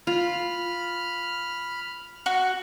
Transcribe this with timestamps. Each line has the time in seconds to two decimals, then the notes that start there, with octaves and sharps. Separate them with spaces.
0.07 F4 B5 F6
2.26 F#4